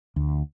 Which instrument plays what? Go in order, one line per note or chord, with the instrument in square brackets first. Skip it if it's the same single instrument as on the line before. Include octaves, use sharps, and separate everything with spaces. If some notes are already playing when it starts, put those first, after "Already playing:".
[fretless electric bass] D2